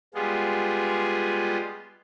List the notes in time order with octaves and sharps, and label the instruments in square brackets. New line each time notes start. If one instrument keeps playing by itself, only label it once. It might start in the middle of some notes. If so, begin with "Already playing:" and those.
[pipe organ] G3 G#3 B3 F4 G#4